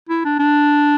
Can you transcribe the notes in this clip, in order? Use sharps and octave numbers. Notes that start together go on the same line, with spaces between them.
E4
D4
D4